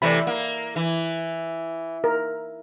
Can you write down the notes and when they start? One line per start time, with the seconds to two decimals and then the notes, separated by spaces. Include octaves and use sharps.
0.02 C3 E3 A3 D5 B5
0.27 A#3
0.76 E3
2.04 A#4